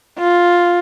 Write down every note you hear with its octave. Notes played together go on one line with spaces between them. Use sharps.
F4